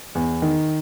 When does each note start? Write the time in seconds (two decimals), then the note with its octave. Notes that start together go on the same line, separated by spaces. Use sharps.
0.15 E2
0.42 D#3